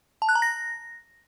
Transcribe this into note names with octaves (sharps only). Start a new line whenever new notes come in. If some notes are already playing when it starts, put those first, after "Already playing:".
A5
F#6
A#5
A#6